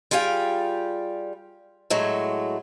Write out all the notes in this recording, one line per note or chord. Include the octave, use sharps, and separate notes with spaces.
G3 F4 G#4 F5 G5
A2 F#3 G#3 A3